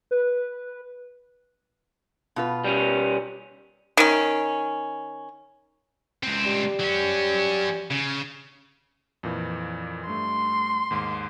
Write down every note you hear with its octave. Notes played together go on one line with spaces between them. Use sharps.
B4
B2 F4 B4
G3 C#4
D#3 C#4
C#2 C4
G3
F#3 C#4
C#3
F2 A#2 E3
G2 A3 C6
D#2 G#2